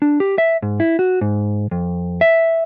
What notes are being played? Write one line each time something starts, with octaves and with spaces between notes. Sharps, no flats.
D4
G4
E5
G#2
E4
F#4
G#2
F2
E5